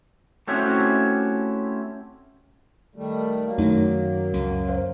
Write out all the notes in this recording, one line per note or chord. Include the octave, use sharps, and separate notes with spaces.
A3 C4 C#4 E4 F#4 G4
D#3 G3 A3
F#3 A#3
F#2 D#3 A3 D#4 C#5
C#2 F#2
C5 F5 C6